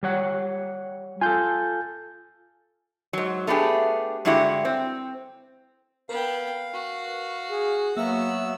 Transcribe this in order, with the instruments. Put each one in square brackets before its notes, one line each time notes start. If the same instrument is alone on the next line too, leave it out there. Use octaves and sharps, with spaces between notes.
[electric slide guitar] G3 C#5 F#5
[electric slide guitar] F4 A4 [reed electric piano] G#5 G6
[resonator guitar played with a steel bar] G#2 F#3
A3 B3 D4 G4 G#4
G2 D3 G#3 E4 F#4 G4
C4
[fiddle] B3 G5 [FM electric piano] A#4 B4 [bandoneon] F5
[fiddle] F#4
[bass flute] G#4
[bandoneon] F#3 B3 E6 [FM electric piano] A#3 F5 [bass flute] E5